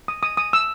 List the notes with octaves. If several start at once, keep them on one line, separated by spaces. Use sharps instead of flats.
D#6
D#6
D#6
E6